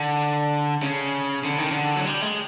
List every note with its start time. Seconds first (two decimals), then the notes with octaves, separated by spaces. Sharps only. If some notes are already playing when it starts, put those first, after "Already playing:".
Already playing: D3
0.83 C#3
1.45 D3
1.58 D#3
1.71 D3
1.96 F#3
2.07 G3
2.22 G#3